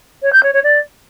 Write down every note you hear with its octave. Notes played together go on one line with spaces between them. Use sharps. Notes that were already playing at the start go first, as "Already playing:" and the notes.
C#5
G6
C#5
C#5
D5